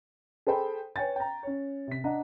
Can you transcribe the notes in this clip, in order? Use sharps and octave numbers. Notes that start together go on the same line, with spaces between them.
G#4 A4 C5 G5 B5
B4 C#5 G5 G#5 A6
G5 A#5
C#4 C#5
C3 B6
D4 D#5 F#5 A#5